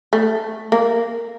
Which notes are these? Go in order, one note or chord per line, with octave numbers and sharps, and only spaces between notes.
A3
A#3